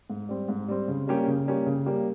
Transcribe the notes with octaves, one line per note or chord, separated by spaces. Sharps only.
G#2
G3 C4
G#2
G3 C4
C#3
G3 A#3 C#4 G4
C#3
G3 A#3 C#4 G4
C#3
G3 A#3 C#4 G4